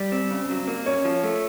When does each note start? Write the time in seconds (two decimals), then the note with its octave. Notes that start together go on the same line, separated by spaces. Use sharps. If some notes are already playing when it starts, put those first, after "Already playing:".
Already playing: G3 D5
0.12 C4
0.31 C#3
0.50 F#3
0.67 A#3
0.86 C#4 C#5
1.05 F3
1.23 A3